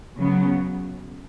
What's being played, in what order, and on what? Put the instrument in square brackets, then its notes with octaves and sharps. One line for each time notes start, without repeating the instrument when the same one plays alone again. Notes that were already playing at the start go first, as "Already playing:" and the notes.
[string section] C#3 F#3 B3